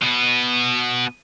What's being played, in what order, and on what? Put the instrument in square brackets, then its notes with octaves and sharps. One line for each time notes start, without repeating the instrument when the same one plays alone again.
[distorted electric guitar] B2 B3